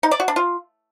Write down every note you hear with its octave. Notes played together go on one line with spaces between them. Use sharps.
D#4
D5
F#4
D4
F4